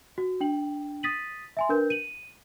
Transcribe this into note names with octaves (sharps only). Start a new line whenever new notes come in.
F#4
D4 G5 F#7
D#6 A6 B6 D#7 F#7
E5 G#5 C6
D4 A#4 B4 G6
D#7 F#7